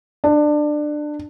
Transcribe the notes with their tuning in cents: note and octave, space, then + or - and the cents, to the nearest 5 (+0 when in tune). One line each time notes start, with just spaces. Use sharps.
D4 +20